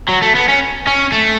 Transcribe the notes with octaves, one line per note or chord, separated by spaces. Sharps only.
F#3
A3
B3
C#4
C#4
A3